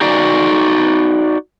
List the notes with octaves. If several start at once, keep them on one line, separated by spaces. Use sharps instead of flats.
D#4 F#4 D5